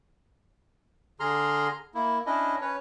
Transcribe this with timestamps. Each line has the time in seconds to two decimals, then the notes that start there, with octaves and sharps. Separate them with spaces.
1.20 D3 G#4 A#5 C6 F6
1.95 A#3 E4
2.26 C#4 D4 E4 D#5
2.61 C#4 B4 C#5